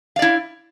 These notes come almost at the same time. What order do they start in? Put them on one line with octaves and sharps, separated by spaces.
F5 D5 E4